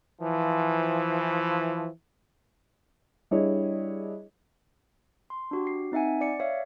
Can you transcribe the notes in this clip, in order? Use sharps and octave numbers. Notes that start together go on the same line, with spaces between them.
E3 F3
G3 D4 E4 G#4 C#5 D#5
C6
D4 F#4 G4
C7
C4 D#4 E5 F#5 G#5
D5 C#7
C#5 D5 E5 F5